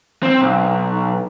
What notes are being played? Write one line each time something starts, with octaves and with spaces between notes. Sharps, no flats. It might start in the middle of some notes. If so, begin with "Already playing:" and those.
C4
B1